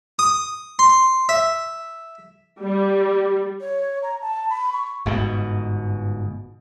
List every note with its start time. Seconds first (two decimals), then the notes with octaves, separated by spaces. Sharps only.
0.19 D#6
0.79 C6
1.29 E5
2.62 G3
3.61 C#5
4.02 A#5
4.21 A5
4.50 B5
4.73 C#6
5.06 G1 G#2 B2